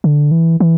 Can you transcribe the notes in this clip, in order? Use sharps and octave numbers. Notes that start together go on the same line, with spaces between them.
D3
E3
E3